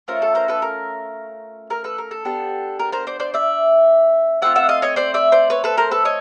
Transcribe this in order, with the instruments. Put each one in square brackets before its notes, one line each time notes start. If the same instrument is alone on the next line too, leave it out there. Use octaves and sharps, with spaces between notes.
[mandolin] A3 C#4 F4 A#4 C5
A4
A#4 C5
A4 B4
A#4
A#4
A4 B4
A#4
A4
B3 D4 G4
A#4
A#4 C5
C5 D5
C5 D5
D5 E5
A3 C4 F4 E5 F#5
E5 F#5
D#5 F5
C#5 D#5
C5 D5
D5 E5
C5 D5
B4 C#5
A4 B4
A#4 C5
A4 B4
C#5 D#5